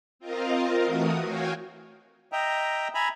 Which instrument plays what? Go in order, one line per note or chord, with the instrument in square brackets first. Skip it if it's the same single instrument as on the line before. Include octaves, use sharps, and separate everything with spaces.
[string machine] C4 F4 A#4 D#5 F5
E3 A3 F#4 A#4 D#6
F#4 C#5 F5 G5 G#5
[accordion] D#5 E5 G5 A#5
E5 G#5 A#5 B5